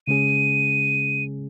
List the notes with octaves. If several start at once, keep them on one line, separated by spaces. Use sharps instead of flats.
C#3 G#3 C#4 G#4 D#7